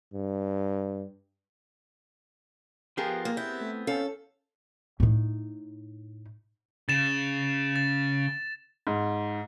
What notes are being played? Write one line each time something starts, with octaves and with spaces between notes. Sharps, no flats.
G2
F3 B3 F4 G4 G#4 A#4
A#3
B3 C4 E4 G6
A3
C#4 A4 F5
A2 D#4
C#3 A6 E7
A6
G#2